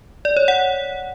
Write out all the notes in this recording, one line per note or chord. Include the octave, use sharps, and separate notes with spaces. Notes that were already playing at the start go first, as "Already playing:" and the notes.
D5
C#5
F#5